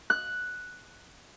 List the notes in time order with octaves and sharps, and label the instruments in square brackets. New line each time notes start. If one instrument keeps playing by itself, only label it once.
[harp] F#6